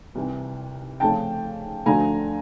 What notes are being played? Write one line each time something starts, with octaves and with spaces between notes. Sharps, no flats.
C2 C3 E3
F2 C#3 F3 A3 C#4 G5 A5
D2 D3 F3 A3 G#5 A#5